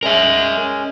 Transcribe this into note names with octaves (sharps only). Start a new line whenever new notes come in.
G#3 C#4 A#4 E5